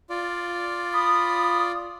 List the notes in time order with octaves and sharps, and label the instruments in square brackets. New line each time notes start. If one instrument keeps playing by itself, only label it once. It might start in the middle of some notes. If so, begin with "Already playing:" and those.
[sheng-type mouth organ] F4 D5
[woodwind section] B5 D#6